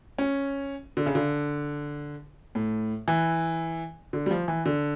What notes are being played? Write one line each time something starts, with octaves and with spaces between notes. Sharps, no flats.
C#4
D3
C#3
D3
A2
E3
D3
G3
F3
E3
D3